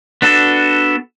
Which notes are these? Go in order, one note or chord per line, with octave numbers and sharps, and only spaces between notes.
B3 D4 F#4 A4